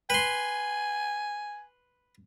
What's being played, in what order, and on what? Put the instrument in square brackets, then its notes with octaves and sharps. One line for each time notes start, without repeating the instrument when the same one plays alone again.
[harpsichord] B4 C6 [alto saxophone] G#5